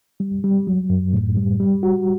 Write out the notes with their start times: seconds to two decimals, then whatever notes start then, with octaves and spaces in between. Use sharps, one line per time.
0.20 G3
0.44 G3
0.67 F#3
0.90 F#2
1.13 A2
1.37 G3
1.60 G3
1.83 F#4